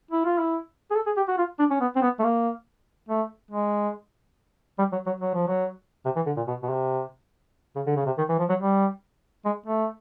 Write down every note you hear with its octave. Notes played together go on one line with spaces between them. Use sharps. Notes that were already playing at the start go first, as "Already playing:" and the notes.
E4
F4
E4
G#4
A4
G#4
G4
F#4
F4
D4
C#4
B3
C4
B3
A3
A#3
A3
G#3
G3
F#3
F#3
F#3
F3
F#3
C3
E3
D3
A#2
B2
B2
C3
C#3
D3
C#3
C3
D#3
E3
F3
F#3
G3
G#3
A3